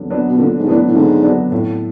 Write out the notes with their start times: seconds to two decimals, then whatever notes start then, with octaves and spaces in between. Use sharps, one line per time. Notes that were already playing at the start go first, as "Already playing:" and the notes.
Already playing: D3 F#3 B3 D4
0.10 F#3 B3 D4
0.28 B2
0.38 A#2 D3
0.58 G#2
0.67 A2 F#3 B3 D4
0.87 A2
0.95 G#2 D3
1.23 F#3 B3 D4
1.52 A2